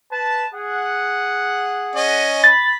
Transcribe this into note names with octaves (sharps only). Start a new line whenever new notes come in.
B4 A5
G#4 F#5
C#4 D#5
B5 A6